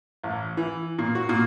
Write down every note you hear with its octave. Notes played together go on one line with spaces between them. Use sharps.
A1
E3
A#2
F#4
A#2